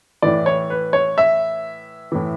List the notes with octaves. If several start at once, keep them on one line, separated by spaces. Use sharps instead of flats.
A2 E3 D5
C#5
B4
C#5
E5
A2 E3